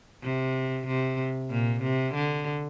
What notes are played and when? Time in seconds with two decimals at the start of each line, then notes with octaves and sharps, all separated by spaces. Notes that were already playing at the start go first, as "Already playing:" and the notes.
0.23 C3
0.87 C3
1.51 A#2
1.83 C3
2.15 D3